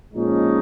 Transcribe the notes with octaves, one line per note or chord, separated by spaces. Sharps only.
A#2 F3 G#3 C#4 D#4